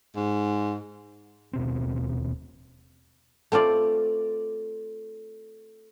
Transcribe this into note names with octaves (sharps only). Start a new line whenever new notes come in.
G#2
D#1 B2 C4
A3 C4 F4 D5 F5